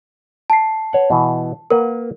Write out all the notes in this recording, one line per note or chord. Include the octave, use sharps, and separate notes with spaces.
A5 C7
B4 C#5 F#5
B2 E3
A#3 A#4 B4 F#5